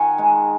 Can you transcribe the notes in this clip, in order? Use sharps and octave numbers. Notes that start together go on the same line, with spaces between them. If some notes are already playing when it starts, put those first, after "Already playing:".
Already playing: D#3 F#5 G#5
G#3 A#5